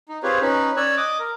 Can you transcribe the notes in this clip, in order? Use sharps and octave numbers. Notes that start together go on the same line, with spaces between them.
D#4
C4 F4 G4 G#4 B4 C#5
C#4 D#4 B4
C#4 C#5 D5 G#5 E6 F#6
D#5 D6 D#6
A#4